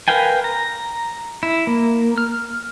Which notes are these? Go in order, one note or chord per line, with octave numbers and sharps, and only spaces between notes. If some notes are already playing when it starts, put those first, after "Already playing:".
A#4 B4 F5 G5 G#5
A#5
E4
A#3
F6